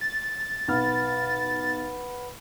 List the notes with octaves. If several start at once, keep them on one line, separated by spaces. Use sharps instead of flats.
A6
B1 B4 F#5 B5 F6